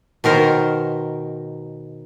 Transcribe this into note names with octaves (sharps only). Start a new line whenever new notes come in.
B2 D#3 A#4 C5